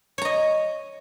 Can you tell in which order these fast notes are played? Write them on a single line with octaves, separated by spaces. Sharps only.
C#5 A#5 D#5